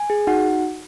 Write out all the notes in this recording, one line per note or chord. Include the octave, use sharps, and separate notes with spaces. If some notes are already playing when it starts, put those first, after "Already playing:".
Already playing: G#5
G#4
D#4 F#4 F#5